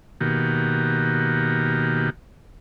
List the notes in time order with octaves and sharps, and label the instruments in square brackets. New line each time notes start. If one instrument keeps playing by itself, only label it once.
[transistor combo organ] B2 D#3 A#3 F#4 G4